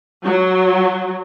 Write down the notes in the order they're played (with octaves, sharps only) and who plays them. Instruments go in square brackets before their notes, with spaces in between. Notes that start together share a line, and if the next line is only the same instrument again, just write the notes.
[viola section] F#3